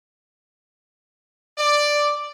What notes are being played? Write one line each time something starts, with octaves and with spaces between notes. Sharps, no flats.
D5